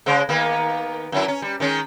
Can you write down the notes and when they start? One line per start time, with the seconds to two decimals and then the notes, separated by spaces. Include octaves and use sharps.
0.06 C#3 G#3 C5
0.29 D#3 A#3 B3
1.12 F#2 F#3 E4
1.28 C#4
1.42 G3
1.60 D#3 G#3 C#4